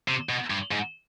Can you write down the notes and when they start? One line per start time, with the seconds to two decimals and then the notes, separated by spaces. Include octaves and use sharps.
0.08 C3
0.29 B2
0.50 G2
0.71 G#2